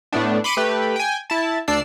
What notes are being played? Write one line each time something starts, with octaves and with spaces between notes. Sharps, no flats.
A2 A3 B3 D4
B5 C6 D6 C#7 D#7
A3 G4 B4
G5 G#5
E4 A5
D2 D4 D5 E6 C7